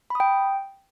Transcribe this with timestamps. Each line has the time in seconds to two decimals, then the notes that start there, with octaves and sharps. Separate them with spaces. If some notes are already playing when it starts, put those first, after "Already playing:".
0.10 B5
0.15 D#6
0.20 G5